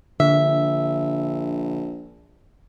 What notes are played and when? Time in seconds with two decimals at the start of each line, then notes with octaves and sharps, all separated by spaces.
0.20 A#1 D3 E5